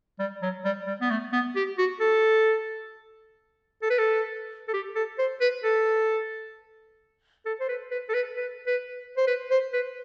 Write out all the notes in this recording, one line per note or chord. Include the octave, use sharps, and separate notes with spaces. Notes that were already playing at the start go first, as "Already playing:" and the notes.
G3
F#3
G3
G3
B3
A3
B3
G4
F#4
A4
A4
B4
A4
A4
G4
A4
C5
B4
A4
A4
C5
B4
B4
A4
B4
B4
B4
C5
B4
C5
B4